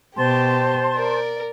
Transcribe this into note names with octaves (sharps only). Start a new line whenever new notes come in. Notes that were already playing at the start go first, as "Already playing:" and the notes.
B2 G4 C5 A5 C6
A#4 D5